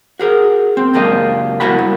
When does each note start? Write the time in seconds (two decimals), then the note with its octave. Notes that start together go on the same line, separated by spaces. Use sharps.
0.19 F#4 G#4 A#4
0.77 C4
0.93 C#2 F#2 A#3 D4 G4 D#5
1.60 B3 E4 F#4 A#4 F#5 B5
1.79 G2